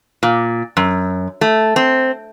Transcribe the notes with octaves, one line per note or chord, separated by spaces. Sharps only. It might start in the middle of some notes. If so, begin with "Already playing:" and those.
A#2
F#2
A3
C4